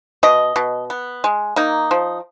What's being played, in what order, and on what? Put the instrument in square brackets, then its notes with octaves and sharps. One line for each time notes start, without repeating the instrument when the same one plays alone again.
[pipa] B2 D#5
B2
B3
G#3
A#3 D#4
F3